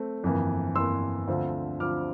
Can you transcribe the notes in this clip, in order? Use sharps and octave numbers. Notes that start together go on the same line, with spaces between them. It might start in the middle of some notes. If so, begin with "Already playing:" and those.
Already playing: A3 C4
G1 F2 E3 A#3
G1 F2 E3 A#3 C6 E6
D2 D3 F3 C4 F4
D2 D3 F3 C4 F4 D6 F6